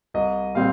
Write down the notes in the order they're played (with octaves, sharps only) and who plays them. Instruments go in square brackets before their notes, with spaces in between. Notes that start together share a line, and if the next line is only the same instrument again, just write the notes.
[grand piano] C2 D#5
A#2 G3 C4 F5